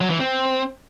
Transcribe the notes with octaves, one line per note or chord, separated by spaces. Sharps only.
F#3
E3
C4